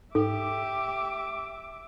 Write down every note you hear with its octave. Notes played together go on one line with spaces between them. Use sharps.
G#2 G4 A4 E5 D6